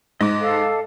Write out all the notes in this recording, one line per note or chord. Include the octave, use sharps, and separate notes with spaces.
G#2 D#5 D6
A4 F5